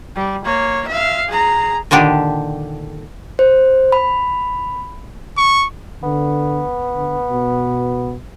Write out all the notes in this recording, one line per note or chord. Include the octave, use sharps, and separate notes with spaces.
G3
A#3 C#5
E5 F5
G#4 A#5
A#2 D3 D#3 D4 G4
C5
B5
C#6
D3 B3
D3
B2